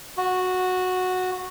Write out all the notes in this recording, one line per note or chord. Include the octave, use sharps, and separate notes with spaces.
F#4